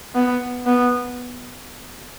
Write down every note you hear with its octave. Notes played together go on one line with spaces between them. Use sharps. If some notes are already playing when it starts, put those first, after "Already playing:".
B3
B3